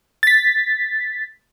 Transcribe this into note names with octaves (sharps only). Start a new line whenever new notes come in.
A6 B6